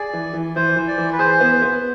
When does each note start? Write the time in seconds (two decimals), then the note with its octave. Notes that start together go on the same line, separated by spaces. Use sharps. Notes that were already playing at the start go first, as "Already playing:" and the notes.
Already playing: G#4 D5
0.13 E3
0.34 E3
0.56 E3 C5
0.76 E3
0.88 D5
0.98 E3
1.12 B4
1.19 G#4 C5
1.41 B3
1.62 B3